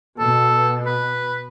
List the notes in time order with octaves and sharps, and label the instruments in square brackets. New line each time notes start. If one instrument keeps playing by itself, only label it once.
[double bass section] B2 [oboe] A4
[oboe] B4